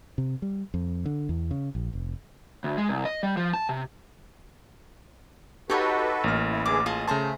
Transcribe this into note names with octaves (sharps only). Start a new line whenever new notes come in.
C3
G3
F2
D3
E2
C#3
A#1
F1
D2
G#3
C2
D#5
G3
F3
A5
C3
D#4 F#4 G4 A4 B4 C#5 D#5
A1 A#3 F6
E4
D3 E3 G#4 D6
F4 G#4 D#5 A5
C#3 A3 G#4 C5 A5 A#5